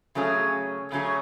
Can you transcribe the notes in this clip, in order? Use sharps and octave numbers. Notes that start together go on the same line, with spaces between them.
C#3 F#3 A3 C#4 G#4
C#3 F#3 A3 C#4 G#4